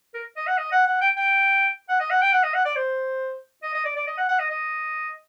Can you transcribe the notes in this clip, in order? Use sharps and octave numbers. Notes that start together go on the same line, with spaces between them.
A#4
D#5
F#5
D#5
F#5
F#5
G5
G5
F#5
D#5
F#5
G5
F#5
D#5
F#5
D5
C5
D#5
D#5
D5
D5
D#5
F#5
F#5
D#5
D#5